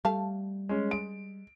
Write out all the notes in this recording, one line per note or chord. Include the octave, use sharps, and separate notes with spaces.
G3 A3 F5 A5
G#3 C#4
G#3 D7